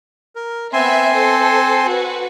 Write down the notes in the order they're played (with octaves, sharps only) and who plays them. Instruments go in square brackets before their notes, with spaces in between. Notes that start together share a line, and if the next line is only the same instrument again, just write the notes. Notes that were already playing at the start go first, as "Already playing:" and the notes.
[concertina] A#4
[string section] B3 E5 [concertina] C4 G#5 C6
[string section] A4 C5
F#4 B4